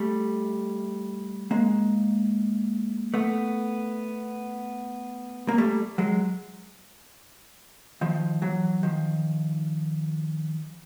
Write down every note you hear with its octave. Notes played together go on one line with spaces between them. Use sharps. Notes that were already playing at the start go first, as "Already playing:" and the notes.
Already playing: G3 A3
G#3 A#3
A3 B3
A#3
G3 A3
F#3 G#3
D#3 F3
E3 F#3
D#3 F3